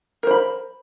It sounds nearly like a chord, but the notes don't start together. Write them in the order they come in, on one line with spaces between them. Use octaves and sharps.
A#4 C5 B5